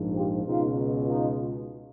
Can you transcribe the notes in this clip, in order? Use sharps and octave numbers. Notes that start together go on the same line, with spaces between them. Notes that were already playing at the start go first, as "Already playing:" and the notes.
Already playing: A#1 G#2 F3
F4 G4
C#2 B2 G#3 D#4 F4
D#4 F4